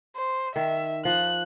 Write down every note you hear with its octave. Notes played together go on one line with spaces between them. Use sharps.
C5
D#3 E5
F3 F#6